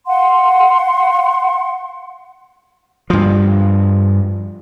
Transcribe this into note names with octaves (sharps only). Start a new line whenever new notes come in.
F5 F#5 C6
G2 F3